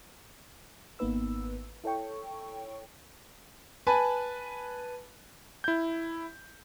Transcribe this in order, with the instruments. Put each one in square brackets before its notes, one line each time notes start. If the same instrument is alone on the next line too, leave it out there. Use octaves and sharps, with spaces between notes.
[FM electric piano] G#1 A#3 B3 D#4 B4 E6
E4 A4 C#5 G5 C#6
[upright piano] B4 G#5 A5 B5
[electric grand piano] E4 G6